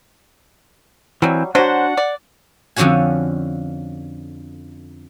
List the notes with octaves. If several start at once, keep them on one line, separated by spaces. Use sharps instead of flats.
E3 F#3 G3 C4
F#3 D4 F#4 C5 F#5
D5
F2 D3 F3 C#4 F#4 G#5